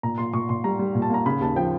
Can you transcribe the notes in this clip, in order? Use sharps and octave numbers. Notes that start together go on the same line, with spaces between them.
A#2 A#5
A#2 C6
A#2 C#6
A#2 C6
G3 A#5
G3
A#2
A5
A#3 A#5
C#3 B5
D#2 A5
F3 G5